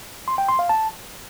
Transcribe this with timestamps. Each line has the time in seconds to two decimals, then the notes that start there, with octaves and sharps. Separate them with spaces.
0.28 C6
0.38 G5
0.49 C6
0.59 F5
0.69 A5